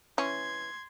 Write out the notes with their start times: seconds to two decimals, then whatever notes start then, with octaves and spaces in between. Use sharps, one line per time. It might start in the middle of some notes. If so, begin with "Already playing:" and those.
0.18 E3 C#4 C6 G#6